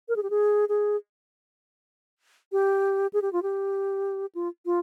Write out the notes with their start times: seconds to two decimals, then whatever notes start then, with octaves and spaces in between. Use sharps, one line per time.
0.09 A#4
0.16 G#4
0.23 G4
0.30 G#4
0.69 G#4
2.52 G4
3.13 G#4
3.22 G4
3.33 F4
3.43 G4
4.35 F4
4.66 F4